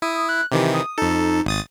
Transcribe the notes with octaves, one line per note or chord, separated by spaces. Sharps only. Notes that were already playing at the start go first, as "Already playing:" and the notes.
E4 D#6
F#6
C3 D#3 E3 G4
D#6
F2 D#4 A4
G#1 D#6 A6